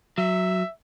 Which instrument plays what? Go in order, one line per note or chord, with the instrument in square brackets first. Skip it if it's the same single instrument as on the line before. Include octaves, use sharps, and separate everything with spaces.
[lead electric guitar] F#3 [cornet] E5